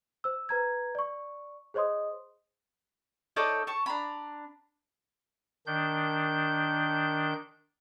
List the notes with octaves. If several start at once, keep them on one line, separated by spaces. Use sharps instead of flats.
C5 E6
B4 A#5 G#6
D5 C#6
G#4 C5 C#5 D#5 C6 D#6
D#4 A4 C#5 D5
A5 C#6
D4 A#5 B5
D#3 D4 G6